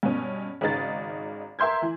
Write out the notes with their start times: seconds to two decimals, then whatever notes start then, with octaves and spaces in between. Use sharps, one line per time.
0.03 G2 B2 C#4
0.61 G#1 C#3 D#4 A6
1.59 A#4 E5 C6 G6 G#6
1.82 E3